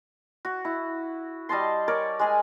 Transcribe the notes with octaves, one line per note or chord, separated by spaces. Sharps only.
F#4
E4
G3 D#5 A5 C6
A#4 C#5 D5
G#3 G#4 G#5